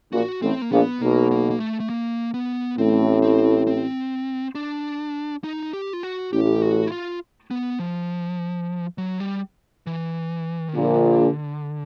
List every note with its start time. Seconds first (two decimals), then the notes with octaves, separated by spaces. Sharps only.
0.13 A#1 A#2 F#4
0.42 A1 A2 C4
0.62 A#3
0.72 A#1 A#2 B3
1.01 B1 B2 A#3
1.31 A#3
1.51 A#3
1.60 A3
1.80 A3
1.89 A#3
2.34 B3
2.78 A1 A2 C4
3.22 C4
3.67 C4
4.55 D4
5.44 D#4
5.73 G4
5.93 F4
6.03 F#4
6.32 A1 A2 G4
6.62 F#4
6.87 E4
6.92 F4
7.51 B3
7.79 F3
8.98 F#3
9.20 G3
9.87 E3
10.68 D#3
10.75 A#1 A#2 D3